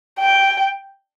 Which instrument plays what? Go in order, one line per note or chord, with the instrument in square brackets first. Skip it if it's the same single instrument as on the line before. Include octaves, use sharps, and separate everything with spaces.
[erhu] G5